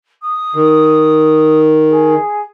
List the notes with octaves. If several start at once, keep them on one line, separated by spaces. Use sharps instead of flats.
D#6
D#3
G#4